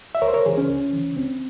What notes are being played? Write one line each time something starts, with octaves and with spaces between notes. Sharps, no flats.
E5
C#2 A#4 C#5
C5
A#4 C#5
C#3 E3 G#4 C5
C#4
C#2
C#3 E3
C#2 C4